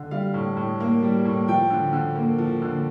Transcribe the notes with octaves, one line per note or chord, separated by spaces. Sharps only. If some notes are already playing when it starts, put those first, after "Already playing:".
Already playing: D3
G3 F5
A2
A2
A#3
G3
A2
F3 G5
D3
D3
A#3
F3
D3